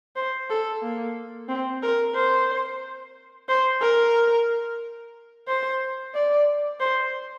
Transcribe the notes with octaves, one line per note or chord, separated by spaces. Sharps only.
C5
A4
A#3
C4
A#4
C5
C5
A#4
C5
D5
C5